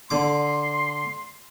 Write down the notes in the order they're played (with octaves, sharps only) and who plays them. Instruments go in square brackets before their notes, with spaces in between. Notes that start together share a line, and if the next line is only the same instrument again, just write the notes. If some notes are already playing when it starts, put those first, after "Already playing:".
[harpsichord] D3 D6 [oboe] C6